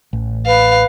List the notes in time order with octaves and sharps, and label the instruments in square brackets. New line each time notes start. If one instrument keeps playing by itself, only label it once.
[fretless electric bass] A1
[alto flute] B4 [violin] F5